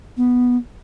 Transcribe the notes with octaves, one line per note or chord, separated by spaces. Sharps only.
B3